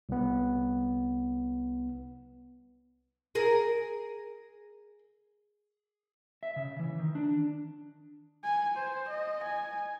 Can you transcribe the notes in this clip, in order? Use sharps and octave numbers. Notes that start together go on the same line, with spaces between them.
C2 B3
G#4 A#4
E5
C#3
E3
D#3
D4
G#5
C5
D#5
G#5